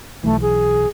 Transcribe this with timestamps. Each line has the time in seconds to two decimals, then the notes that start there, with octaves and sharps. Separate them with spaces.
0.24 B1 E3 A3
0.42 G#4